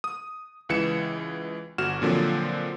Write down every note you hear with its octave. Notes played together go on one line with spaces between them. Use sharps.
D#6
C#2 E3 C#7 E7
G1 F#4 F6 E7
A#2 D3 F3 F#3 C4